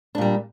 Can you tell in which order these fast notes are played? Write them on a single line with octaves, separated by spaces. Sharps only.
D4 A#2 G3